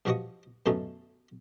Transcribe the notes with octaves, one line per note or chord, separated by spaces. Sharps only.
G2 F3 F#4 D#5 C#6 D#6
F#2 B2 D3 A3 C#4 D#4